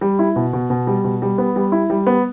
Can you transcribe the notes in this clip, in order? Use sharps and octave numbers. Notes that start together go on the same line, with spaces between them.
G3
E4
B2
B2
B2
G3
B2
G3
B3
G3
E4
G3
B3